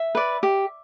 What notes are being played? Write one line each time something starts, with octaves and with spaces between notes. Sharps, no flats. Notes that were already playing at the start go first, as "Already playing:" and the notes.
Already playing: E5
B4 D5
G4